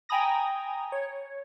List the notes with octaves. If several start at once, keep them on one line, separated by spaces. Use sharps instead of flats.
G5 G#5 A#5 B5 D#6 A#6
C#5